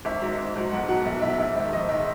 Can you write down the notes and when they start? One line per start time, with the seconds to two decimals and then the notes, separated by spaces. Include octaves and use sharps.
0.05 G#1 E5
0.21 G#2 F#3
0.38 G#1
0.56 G#2 F#3
0.72 B1 F#5
0.88 B2 F#3 F#5
1.05 B1 E5
1.22 B2 F#3 E5
1.39 A#1 E5
1.56 G#2 D#3 E5
1.73 A#1 D#5
1.89 G#2 D#3 E5